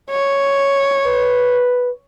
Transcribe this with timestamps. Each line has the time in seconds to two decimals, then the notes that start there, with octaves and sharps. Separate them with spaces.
0.11 C#5
1.06 B4